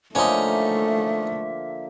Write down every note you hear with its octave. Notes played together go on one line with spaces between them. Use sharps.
D3 F3 A3 A#3 C#4 D#4 E5